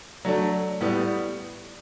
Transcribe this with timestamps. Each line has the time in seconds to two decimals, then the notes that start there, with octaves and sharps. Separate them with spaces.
0.25 F#3 A3 D4
0.80 A2 G3 B3